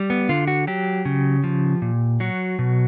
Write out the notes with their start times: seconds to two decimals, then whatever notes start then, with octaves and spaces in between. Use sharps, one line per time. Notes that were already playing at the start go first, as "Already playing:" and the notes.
Already playing: G3
0.10 B3
0.29 D3 F4
0.48 F#4
0.67 F#3 G4
1.05 C#3
1.44 F3
1.82 A#2
2.20 F#3 F#4
2.59 B2